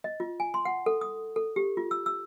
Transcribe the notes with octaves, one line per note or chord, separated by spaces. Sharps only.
D#5
F4
G#5
C6
F#5
A4
D#6
A4
G4
F4
E6
E6